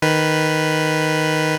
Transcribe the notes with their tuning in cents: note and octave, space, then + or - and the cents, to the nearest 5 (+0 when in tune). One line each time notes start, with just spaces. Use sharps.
D#3 +0 B4 +0